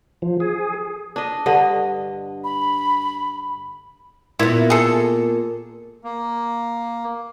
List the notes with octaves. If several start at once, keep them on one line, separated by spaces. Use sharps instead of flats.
F3
G#4
D4 D#5
G2 D3 D#5
B5
A#2 B3 E4
G#4 A4
A#3